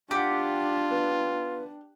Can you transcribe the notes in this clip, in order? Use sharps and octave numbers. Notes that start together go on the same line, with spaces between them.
D4 F4 G4 F#5 D6
B3